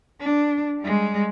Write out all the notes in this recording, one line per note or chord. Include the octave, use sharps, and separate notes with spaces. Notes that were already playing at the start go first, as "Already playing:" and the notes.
D4
G3 G#3